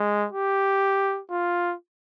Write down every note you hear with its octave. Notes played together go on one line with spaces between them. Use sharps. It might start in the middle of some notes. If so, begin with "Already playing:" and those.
Already playing: G#3
G4
F4